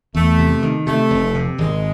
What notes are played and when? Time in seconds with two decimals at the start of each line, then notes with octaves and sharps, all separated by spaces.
0.15 E2 A3
0.38 C3
0.62 D#3
0.86 C3 A3
1.10 F1
1.34 C3
1.58 G#1 G#3